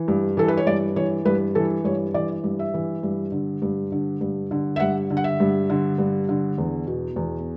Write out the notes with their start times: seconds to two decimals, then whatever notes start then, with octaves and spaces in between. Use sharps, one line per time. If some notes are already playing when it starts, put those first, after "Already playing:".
Already playing: E3
0.08 G2
0.37 E3 A4
0.48 B4
0.57 C#5
0.66 G2 D5
0.96 E3 C#5
1.25 G2 B4
1.55 E3 A4
1.84 G2 C#5
2.14 E3 D5
2.44 G2
2.59 E5
2.74 E3
3.03 G2
3.32 D3
3.62 G2
3.92 D3
4.21 G2
4.51 D3
4.76 E5
4.80 G2 F#5
5.11 D3
5.17 F#5
5.24 E5
5.40 G2
5.70 D3
5.98 G2
6.29 D3
6.58 E2
6.87 B2
7.16 E2